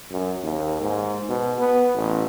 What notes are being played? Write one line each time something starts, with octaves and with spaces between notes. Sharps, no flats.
F#2
D#2
G#2
B2
B3
A1